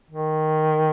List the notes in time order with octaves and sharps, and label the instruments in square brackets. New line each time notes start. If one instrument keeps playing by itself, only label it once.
[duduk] D#3